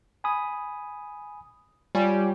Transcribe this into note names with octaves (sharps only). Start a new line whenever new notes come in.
G#5 B5 D#6
G3 F4 C#5 G#5